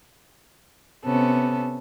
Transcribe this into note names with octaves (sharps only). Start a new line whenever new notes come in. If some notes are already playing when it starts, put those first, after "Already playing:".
C3 B3 C#4 A4